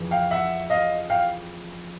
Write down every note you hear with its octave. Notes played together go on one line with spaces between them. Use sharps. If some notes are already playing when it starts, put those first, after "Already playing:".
Already playing: F2 C#3 E3
F5 G5
E5 F#5
D#5 F5
F5 G5